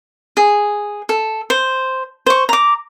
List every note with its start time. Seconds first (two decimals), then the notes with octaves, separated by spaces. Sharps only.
0.37 G#4
1.09 A4
1.50 C5
2.26 C5 C#6
2.49 A#5 D6